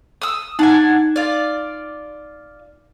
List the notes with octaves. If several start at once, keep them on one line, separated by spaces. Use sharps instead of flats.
D#6 E6
D4 D#4 F#5 G#5
F4 D5